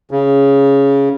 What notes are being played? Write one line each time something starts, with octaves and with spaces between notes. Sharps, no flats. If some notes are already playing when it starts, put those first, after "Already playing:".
C#3